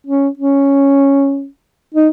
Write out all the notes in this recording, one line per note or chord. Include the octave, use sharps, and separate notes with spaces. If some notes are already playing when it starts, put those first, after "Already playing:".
C#4
C#4
D#4